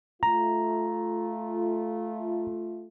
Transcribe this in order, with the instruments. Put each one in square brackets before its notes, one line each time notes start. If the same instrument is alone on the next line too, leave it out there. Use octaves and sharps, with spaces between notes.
[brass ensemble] A3 F4 [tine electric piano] A#5